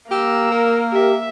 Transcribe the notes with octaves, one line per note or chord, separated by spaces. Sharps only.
A#3 G4 A#5 E6
A#4
G4 E5